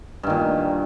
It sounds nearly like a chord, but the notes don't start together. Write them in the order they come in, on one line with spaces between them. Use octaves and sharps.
G2 D#3 A#2